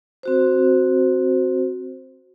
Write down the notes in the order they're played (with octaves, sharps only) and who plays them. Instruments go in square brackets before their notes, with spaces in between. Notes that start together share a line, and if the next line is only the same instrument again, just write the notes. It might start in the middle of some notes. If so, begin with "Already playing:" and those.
[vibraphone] C4 F#4 C5